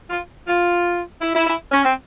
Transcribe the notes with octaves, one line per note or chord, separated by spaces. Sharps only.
F4
F4
E4
E4
E4
C#4
C4